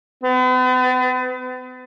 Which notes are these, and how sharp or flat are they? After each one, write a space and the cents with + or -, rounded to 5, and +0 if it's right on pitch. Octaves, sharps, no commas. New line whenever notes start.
B3 +45